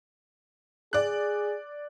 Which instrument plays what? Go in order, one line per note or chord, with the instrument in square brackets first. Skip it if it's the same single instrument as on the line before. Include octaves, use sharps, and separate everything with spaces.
[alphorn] G#4 [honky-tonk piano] D5 F#6